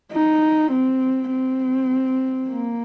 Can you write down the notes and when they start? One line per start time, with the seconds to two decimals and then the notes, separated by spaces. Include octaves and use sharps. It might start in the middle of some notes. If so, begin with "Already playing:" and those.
0.13 D#4
0.72 C4
1.31 C4
2.50 A#3